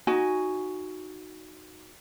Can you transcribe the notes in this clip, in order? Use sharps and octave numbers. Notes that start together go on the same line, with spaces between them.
D#4 F#4 G#5